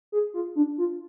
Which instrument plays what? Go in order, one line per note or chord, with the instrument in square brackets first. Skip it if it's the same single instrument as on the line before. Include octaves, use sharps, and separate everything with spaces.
[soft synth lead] G#4
F4
D4
F4